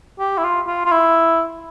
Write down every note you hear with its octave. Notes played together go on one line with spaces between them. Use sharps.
G4
E4
F4
F4
F4
E4